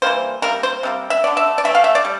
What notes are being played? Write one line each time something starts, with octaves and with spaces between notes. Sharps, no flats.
E3 G3 A#3 C5
C3 G3 A#3 A#4
C5
C3 G3 A#3
E5
D3 A3 D5
E5
D5
E3 A3 E5
F5
E5
D5
G3